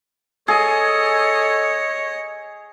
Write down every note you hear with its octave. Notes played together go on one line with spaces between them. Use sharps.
G#4 A4 C#5 D#5